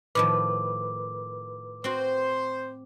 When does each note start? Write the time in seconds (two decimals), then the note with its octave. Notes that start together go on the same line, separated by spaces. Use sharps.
0.15 A2 D#3 F3 B4 D6
1.84 C4 F#4 C5